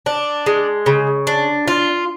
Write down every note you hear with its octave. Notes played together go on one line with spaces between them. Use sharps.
D4
G#3
C#3
D4
F4